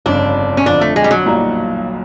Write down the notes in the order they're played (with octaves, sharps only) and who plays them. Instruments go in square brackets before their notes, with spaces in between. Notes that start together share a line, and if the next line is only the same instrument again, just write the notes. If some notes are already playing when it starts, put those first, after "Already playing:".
[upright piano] G1 F2 C#3 [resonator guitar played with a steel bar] D4
[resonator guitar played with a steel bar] C#4
[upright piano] F2 D3 F3 [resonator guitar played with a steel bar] D4
[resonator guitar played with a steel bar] A3
G#3
G3
F#3
[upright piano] B1 A#2 G3 A#3 D#4